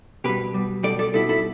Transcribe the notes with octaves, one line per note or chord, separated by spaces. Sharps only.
B2 G3 G4 B4
B2 G3
B2 G3 A4 D5
A4 D5
B2 G3 E4 A4
E4 A4